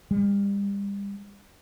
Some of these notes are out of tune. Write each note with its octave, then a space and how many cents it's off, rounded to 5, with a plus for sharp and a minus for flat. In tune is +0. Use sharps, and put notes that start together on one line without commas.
G3 +35